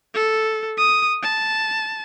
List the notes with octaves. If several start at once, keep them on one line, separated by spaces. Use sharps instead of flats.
A4
D#6
A5